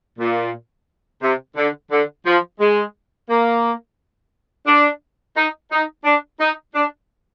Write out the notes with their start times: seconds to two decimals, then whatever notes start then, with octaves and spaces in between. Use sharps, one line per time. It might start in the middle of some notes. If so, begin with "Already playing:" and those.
0.19 A#2
1.22 C3
1.57 D3
1.91 D3
2.25 F3
2.60 G#3
3.29 A#3
4.66 D4
5.36 D#4
5.71 D#4
6.04 D4
6.39 D#4
6.74 D4